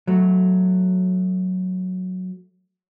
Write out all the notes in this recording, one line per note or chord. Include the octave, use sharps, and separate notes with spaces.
F#3 A3